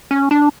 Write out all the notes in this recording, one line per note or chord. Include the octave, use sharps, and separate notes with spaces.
C#4
D4